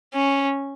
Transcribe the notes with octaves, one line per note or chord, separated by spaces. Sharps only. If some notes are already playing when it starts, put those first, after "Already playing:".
C#4